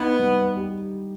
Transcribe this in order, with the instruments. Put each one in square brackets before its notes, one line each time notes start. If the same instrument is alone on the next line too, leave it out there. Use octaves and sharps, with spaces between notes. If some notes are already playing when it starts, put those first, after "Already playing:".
Already playing: [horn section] B3 [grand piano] D#4
[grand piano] G3
G4